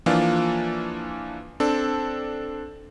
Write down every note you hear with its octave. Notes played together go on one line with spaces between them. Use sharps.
E3 F3 A#3 D4 F4
C4 D4 A4